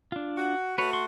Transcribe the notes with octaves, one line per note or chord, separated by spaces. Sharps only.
D4 F4
F#4
A3 F#4 B4 C#5
C6 C#6